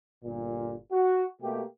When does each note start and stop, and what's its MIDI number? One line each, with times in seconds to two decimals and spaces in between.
0.25 0.75 31
0.25 0.75 46
0.92 1.24 66
1.42 1.62 47
1.42 1.62 57
1.42 1.62 58
1.42 1.62 67